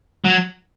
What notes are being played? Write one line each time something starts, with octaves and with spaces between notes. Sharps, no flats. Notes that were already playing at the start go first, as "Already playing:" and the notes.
F#3